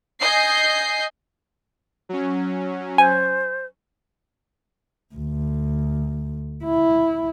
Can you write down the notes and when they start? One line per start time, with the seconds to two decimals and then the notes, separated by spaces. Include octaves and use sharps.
0.22 D#5 G#5 G6 C7
2.09 F#3 C#4
2.98 C5 G#5
5.15 D2
6.64 E4